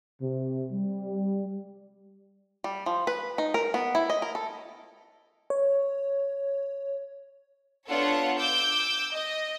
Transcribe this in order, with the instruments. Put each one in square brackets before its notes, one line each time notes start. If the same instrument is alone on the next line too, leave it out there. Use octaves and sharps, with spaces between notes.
[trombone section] C3
G3
[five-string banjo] G3
F3
B4
D#4
A#4
B3
E4
D#5
A#4
A4
[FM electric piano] C#5
[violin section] B3 D4 F4 A4 C#5 F#5
D6 E6 G6
D#5